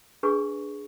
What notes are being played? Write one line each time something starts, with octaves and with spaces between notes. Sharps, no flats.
D4 G#4 B4 G#5 C#6